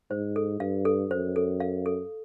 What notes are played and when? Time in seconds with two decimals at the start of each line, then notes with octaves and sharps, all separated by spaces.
0.11 G#2 C5
0.36 A4
0.60 G2 F5
0.85 A4
1.10 F#2 C5
1.36 A4
1.60 F5
1.86 A4